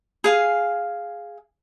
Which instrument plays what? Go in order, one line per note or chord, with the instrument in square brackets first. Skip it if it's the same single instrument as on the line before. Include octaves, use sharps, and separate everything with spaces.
[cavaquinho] G#4 F5 G#5